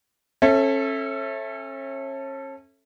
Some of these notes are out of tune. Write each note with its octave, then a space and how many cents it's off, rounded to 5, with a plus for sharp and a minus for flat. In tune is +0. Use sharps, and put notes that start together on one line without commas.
C#4 -35 A4 +0 E5 +0